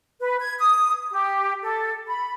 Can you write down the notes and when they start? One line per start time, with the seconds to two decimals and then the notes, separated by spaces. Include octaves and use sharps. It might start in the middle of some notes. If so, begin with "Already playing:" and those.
0.20 B4
0.40 G#6
0.58 D#6
1.11 G4
1.62 A4
2.07 B5